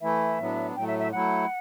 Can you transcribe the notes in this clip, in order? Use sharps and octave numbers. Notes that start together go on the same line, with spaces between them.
E3 A3 E4 E5
A2 F#3 B3 D4
A2 F#3 A3 G5
E5
E5
F#3 A3 E4 F#5